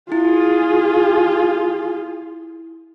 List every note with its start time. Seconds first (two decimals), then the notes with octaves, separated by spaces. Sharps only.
0.12 E4 F4 G#4